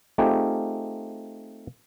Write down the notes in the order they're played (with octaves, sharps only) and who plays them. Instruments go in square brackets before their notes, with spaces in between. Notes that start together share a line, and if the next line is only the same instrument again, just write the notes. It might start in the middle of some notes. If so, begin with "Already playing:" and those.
[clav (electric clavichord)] A3 C4 D#4 F4 G4 G#4